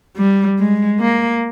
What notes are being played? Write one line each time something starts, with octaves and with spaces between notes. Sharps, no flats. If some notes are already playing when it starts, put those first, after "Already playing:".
G3
G#3
A#3